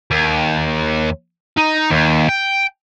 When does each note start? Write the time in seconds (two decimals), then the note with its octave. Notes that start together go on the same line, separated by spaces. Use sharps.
0.11 D#2
1.57 D#4
1.91 D#2
2.29 G5